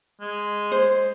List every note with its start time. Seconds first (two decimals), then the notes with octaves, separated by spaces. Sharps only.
0.21 G#3
0.72 C5